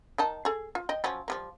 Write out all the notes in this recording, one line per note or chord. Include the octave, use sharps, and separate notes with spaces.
D#3 D#4 A5
G#4 A4
F4
D#5 G5
F3 F#3 C#4
F3 G3 A#3